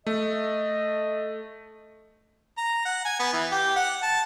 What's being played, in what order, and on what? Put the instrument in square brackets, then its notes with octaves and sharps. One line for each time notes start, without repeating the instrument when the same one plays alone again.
[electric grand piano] A3 [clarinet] D#5
[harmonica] A#5
F#5
G#5
B3
E3
G4
F#5
A5